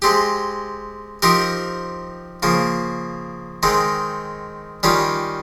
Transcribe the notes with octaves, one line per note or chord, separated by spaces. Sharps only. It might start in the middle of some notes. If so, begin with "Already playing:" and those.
G#3 C4 G4
F3 C4 D#4 G4 A#4
C#3 F3 A#3
D#3 G#3 C4 D#4
D#3 G3 C#4 F4